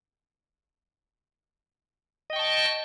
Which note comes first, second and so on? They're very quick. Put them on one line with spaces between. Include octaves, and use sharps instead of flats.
D#5 G5 C#6 A5